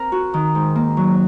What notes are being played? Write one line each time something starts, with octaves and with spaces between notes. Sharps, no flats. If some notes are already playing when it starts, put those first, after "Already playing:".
Already playing: C4 A#4
F#4
D#3
G#2
A#3
F#3